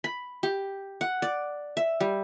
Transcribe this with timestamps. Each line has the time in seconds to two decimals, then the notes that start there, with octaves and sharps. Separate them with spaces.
0.04 B5
0.43 G4
1.01 F#5
1.22 D5
1.77 E5
2.00 G3